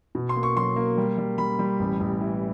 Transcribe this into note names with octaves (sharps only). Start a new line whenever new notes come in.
B2
C6
A#3
C#6
F#3 C6
A#3
G3
G3
G3 B5
G3
A1
A1
E3